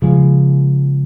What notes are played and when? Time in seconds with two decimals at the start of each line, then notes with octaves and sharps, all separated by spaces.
0.02 C#3 F3 G#3